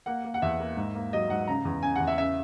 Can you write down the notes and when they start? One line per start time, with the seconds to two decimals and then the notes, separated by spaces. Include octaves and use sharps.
0.06 A#3 F#5
0.24 A#3
0.34 F#5
0.42 E2 E5
0.60 A#3
0.77 G#2
0.95 A#3
1.13 F#3 D#5
1.30 G#2 F#5
1.47 C#3 A#5
1.65 E2
1.83 C#3 G#5
1.96 E2 F#5
2.07 E5
2.18 C#3 E5